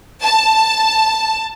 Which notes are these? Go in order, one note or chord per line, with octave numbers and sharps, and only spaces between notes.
A5